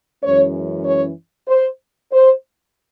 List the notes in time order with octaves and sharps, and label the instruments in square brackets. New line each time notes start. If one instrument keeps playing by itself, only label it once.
[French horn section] F#2 E3 G#3 C#4 C#5
C#5
C5
C5